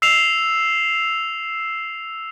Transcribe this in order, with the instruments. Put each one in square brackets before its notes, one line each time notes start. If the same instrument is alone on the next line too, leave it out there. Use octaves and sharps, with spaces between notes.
[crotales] E6 C7 E7 F7